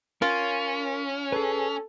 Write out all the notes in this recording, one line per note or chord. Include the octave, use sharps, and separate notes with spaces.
C#4 F4 A#4
G#4 A4 B4